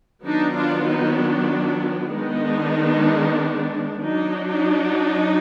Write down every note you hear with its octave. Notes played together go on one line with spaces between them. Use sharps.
D#3 F#3 B3 D4 D#4
D4 F4
D#4
D4
D#3 G#3 B3 D4 D#4
F#3 D4 D#4
D#4